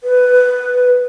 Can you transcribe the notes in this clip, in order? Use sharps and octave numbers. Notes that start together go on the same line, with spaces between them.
B4